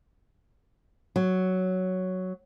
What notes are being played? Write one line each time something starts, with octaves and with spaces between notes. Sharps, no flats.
F#3